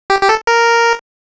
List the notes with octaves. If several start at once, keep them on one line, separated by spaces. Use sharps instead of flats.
G4
G4
A4
A#4